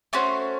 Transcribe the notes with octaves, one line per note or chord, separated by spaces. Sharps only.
A3 C#4 F#4 C5